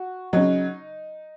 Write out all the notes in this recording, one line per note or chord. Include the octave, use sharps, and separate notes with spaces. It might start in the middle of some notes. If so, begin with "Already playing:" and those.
Already playing: F#4
C#3 F#3 D#4